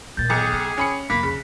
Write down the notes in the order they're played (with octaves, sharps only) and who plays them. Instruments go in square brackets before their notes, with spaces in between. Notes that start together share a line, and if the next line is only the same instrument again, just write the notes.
[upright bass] D#2 A#2 [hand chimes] G6 A6
[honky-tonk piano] B1 C#7 [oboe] G#4 [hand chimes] G5 D6 D#6
[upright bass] C#3
[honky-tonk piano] C#4 B5 C#7
[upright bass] C2 F2 [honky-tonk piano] A#3 [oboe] B5 [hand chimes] F#6 B6
[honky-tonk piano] C#3